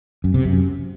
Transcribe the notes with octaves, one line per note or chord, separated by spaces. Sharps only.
F#2
C3
F#2